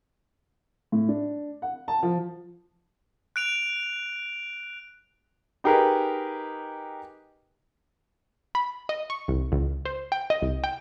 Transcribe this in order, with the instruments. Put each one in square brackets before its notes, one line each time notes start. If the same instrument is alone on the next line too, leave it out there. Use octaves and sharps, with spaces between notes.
[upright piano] A2
D4
F#5
A5
F3
[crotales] F#6 D7 F7
[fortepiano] D#4 G4 G#4 A#4 B4 D#5
[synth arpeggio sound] B5
D#5
C#6
C2
C#2
C5
G5
D#5
C2
G5